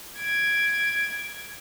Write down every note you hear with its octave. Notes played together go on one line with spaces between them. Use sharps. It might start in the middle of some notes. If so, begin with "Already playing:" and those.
G#6 D7